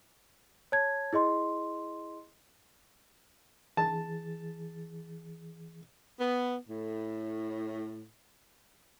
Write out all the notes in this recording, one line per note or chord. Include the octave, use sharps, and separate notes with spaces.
C#5 A5 G#6
E4 G#4 D#5 C6
E3 G#4 A5 A6
B3
A2